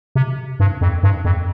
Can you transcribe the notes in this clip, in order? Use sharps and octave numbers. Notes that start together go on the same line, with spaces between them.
C3
G2
F2
G2
F2